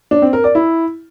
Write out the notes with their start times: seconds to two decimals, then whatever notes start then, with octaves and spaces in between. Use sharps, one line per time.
0.11 D4
0.22 C4
0.33 A#4
0.44 D5
0.55 E4